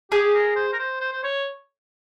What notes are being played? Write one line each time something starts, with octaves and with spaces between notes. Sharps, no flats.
G4 G#4
A#4
C5
A#4
C5
C5
C5
C#5